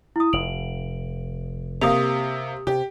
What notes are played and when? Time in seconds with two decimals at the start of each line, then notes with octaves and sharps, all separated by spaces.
0.16 E4 D#6
0.33 F1 D7 F7 F#7
1.82 C3 A#3 G4 D#6 F7
2.67 C3 G4